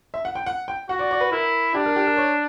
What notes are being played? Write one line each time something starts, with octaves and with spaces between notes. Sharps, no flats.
E5
F#5
G5
F#5
G5
F#4 F#5
D5
D5
B4
E4 A#4
D4 G4
A#4
G4
A#4
C#5